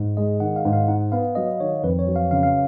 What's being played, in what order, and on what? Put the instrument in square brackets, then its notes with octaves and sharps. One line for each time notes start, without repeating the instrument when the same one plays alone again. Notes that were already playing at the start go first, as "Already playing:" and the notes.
Already playing: [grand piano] G#2
[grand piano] G#3 [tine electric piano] D#5
[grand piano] D#3 [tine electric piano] F#5
[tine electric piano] F5
[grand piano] G#2
[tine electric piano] F5
[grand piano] D#4 [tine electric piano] F#5
[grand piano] B3 [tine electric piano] F5
[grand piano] F#3 [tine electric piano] D#5
[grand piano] D#3 [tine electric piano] C#5
[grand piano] F2 [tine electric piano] B4
[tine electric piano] C#5
[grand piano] F#3
[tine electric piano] F5
[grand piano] C#3 [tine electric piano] F5
[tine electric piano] F5